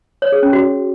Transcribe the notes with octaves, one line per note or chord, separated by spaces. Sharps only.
C#5
G#4
C#4
F#4